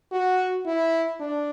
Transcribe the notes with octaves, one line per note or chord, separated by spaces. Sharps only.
F#4
E4
D4